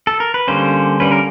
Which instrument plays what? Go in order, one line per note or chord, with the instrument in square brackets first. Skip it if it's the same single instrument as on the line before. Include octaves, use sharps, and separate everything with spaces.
[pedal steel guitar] A4
A#4
B4
D3 G3 A#3 C#4 C5
D3 G3 A#3 C#4 B4
A#4